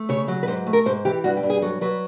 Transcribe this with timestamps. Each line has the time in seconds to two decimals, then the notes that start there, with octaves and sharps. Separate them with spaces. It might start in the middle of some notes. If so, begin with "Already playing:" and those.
Already playing: A3
0.09 C#3 C#5
0.28 F#3
0.43 B4
0.47 G#2 C5
0.67 A3
0.73 A#4
0.86 G#2 C5
1.05 E3 G4
1.24 G2 F#4
1.37 G4
1.43 G2
1.50 G#4
1.62 F#3 A4
1.81 F#3 B4